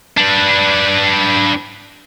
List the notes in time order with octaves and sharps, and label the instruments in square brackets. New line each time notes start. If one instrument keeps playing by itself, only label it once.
[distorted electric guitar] D4 B4